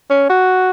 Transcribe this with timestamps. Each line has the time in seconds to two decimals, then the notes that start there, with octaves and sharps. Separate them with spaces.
0.10 C#4
0.30 F#4